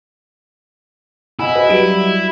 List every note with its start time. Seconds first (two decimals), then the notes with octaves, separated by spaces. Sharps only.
1.39 E4 D#5 F#5 G#5
1.55 F#4 B4 D#5
1.69 F#3 G3 D7